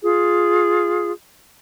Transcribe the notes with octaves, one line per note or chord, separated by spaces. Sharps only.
F4 G#4